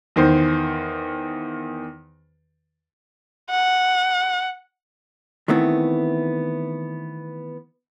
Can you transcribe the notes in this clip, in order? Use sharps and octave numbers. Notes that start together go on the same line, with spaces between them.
E2 D#3 C5
F#5
D#3 E3 A3 B3 C4 E4